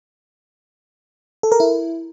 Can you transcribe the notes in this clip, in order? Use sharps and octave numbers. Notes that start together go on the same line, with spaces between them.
A4
A#4
E4